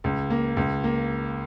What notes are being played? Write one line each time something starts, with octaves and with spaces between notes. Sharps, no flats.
C#2
A#3
C#2
A#3